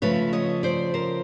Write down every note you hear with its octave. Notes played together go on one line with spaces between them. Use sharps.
C#3 F3 A3 C#4 B4 C#5
C#5 D#5
C5 D5
A#4 C5